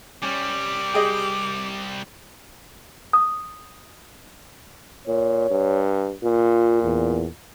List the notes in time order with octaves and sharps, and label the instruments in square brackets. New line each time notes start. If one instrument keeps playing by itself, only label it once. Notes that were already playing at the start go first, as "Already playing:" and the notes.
[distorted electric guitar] C2 G3 [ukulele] C#4 [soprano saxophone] D6
[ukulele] G4 G#4 D#5
[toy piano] D#6
[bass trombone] A#2 [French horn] C#5
[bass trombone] G2
[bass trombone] A#2 [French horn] F4
[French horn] E2